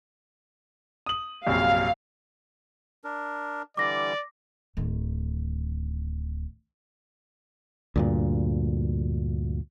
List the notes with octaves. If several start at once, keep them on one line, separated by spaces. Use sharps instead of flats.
D#6 F#7
A#1 F#2 C3 F5
D4 A#4
D3 E3 G3 D5 D6 A#6
D1 D#3
D2 G2 A#2